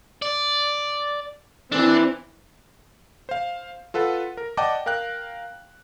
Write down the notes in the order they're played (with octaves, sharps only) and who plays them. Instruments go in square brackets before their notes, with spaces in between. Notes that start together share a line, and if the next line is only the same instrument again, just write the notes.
[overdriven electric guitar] D5
[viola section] E3 C4 [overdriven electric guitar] D4
[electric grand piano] C5 F5
F4 A4 B4 F#5
A#4
D5 D#5 F#5 G5 A5 D6
A#4 F5 G5 F#6